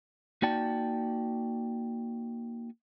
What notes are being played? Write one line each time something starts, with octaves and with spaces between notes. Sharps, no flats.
A#3 D#4 F#4 D5 G5 A5